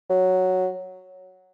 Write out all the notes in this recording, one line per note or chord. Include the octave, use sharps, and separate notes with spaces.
F#3